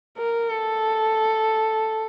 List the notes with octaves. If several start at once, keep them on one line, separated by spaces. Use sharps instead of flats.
A#4
A4